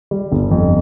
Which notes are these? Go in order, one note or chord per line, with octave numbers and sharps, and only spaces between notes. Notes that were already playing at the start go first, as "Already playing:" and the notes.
G3
G1
F2